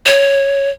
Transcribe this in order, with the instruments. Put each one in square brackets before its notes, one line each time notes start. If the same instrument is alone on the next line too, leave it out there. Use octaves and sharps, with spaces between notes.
[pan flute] C#5